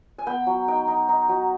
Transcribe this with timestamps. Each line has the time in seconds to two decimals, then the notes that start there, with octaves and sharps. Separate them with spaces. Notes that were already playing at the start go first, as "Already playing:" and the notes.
0.18 G#5
0.27 B3 G5
0.47 F#3
0.68 D#4 G5
0.88 D#4
1.09 D#4
1.29 F#3